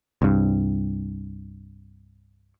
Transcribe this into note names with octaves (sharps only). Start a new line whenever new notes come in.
C2 G2